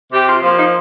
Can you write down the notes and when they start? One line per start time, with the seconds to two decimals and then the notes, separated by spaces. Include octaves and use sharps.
0.12 C3 G4
0.28 F4
0.43 F3 A#3 F4
0.58 D#4